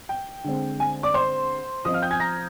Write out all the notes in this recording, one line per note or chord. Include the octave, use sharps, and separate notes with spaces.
G5
D3 G#3 C4
G#5
D5 D6
C5 C6
F3 C4 D#5 D#6
F5 F6
G5 G6
G#5 G#6
A#5 A#6